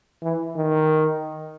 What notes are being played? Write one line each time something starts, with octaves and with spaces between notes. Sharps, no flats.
E3
D#3